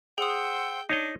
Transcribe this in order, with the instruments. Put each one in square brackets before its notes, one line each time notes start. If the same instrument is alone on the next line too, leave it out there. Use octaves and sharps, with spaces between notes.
[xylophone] G#4 D#6 [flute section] C5 F#5 E6 [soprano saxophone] G5
[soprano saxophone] D4 [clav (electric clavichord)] D#4 C#5 D#5